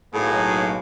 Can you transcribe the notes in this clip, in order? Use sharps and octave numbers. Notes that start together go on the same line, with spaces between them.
B1 A2 A#3 F#4 G#4